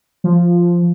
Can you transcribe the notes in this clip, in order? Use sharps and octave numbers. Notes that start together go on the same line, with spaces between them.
F3